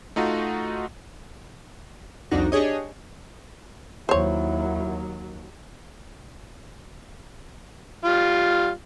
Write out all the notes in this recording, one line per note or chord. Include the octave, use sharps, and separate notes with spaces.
A3 D#4 F4 F#4
C2 F2 D4 D#4 F#4 A#6
D4 G4 G#4 C#5 D#5
D#2 F#3 E4 C5 C#5
G3 F4